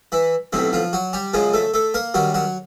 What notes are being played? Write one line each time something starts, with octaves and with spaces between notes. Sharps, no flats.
E3 E4
B1 A2 C3 F#3 C4
F3 F4
F#3 F#4
G3 G4
F#2 C#3 F3 G#3 G#4
A3 A4
A3 A4
A#3 A#4
F#2 D#3 F#3 G3 F#4
F#3 F#4